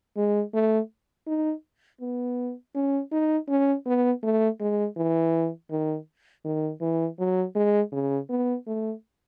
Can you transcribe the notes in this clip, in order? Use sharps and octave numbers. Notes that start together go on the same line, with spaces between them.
G#3
A3
D#4
B3
C#4
D#4
C#4
B3
A3
G#3
E3
D#3
D#3
E3
F#3
G#3
C#3
B3
A3